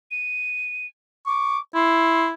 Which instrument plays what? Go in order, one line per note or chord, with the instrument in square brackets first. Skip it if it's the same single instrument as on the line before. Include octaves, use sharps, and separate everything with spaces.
[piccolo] D#7
[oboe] C#6 [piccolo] D6
[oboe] E4 [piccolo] C6